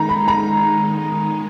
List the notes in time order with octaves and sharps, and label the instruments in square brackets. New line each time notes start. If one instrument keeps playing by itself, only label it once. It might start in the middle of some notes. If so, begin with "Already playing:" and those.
Already playing: [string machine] D#3 G#3 D#4 [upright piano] A#5
[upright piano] B5
A#5